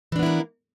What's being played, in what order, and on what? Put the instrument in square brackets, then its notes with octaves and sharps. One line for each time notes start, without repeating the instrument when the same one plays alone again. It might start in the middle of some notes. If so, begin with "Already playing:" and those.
[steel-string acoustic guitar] E3
D4
B3
E4
A#3